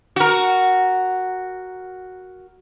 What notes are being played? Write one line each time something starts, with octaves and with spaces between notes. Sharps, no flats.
F#4 A#4